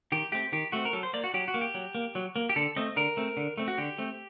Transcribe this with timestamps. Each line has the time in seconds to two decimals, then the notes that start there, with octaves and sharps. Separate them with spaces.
0.12 D#3 G4
0.32 A3 C4 G4
0.52 D#3 G4
0.72 A3 C4 F#4
0.85 A#4
0.93 F#3 A4
1.03 C5
1.13 A#3 D5
1.24 F#4
1.34 F#3 G4
1.48 F#4
1.54 A#3
1.61 G4
1.74 F#3
1.95 A#3
2.15 F#3
2.36 A#3
2.49 G4
2.56 D3 A4
2.76 A3 C4 D#5
2.96 D3 A#4
3.17 A3 C4
3.37 D3
3.58 A3 C4
3.68 F#4
3.78 D3 G4
3.98 A3 C4